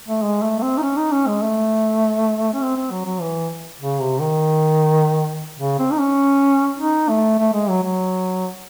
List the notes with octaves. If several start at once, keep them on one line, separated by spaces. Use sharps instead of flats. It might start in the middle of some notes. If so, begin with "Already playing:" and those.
A3
G#3
A3
A3
C4
D#4
C#4
D#4
C#4
G#3
A3
C#4
C4
C4
F#3
F#3
E3
C#3
C3
D#3
C#3
C4
D#4
C#4
D#4
A3
A3
G#3
F#3
F#3